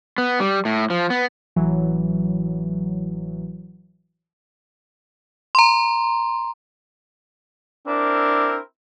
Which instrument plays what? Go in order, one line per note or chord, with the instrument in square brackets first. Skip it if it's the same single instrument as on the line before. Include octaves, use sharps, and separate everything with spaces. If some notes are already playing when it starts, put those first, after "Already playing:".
[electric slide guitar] B3
G3
A2
F3
B3
[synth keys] A1 E3 F#3
[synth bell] A#5 C6
[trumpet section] C4 E4 A#4 [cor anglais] D4